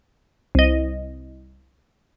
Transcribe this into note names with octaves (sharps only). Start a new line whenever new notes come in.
C2 D#5